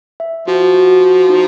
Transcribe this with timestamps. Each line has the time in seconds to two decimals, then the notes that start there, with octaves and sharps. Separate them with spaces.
0.20 E5
0.48 F3 F#4
0.74 F#4
1.01 F#4
1.29 D#4